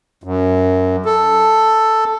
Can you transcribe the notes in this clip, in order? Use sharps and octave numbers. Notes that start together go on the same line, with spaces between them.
F#2
A4